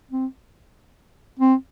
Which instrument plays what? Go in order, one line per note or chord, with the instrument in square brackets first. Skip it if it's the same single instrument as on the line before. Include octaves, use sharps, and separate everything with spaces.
[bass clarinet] C4
C4